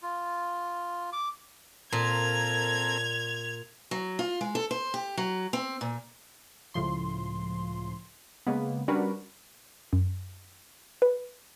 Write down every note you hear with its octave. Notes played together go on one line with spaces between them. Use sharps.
F4
D6
A#2 C4 A4 A#4 G#6 F7
F#3
F4
G#3
A4
C5
G4
F#3
C4
A#2
C#2 A2 F3 C6
C#3 G#3 A#3 B3
G3 C#4 D4 F#4 A#4 B4
F#2
B4